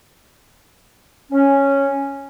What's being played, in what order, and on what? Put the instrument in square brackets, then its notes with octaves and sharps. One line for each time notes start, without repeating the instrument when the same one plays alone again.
[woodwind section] C#4